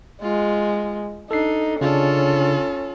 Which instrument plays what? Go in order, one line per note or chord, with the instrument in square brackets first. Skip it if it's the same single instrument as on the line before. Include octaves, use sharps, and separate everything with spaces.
[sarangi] G#3 [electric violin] F4
[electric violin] D4 [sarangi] D#4 [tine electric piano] A4 C7
[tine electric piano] C#3 D4 [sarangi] C#4 [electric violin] F4 A4